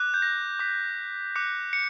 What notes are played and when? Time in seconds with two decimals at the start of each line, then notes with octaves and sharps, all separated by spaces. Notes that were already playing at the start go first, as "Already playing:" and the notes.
Already playing: D6 F#6
0.14 G6
0.22 A#6
0.59 D6 F#6 B6
1.35 D6 F#6 C#7
1.73 C#7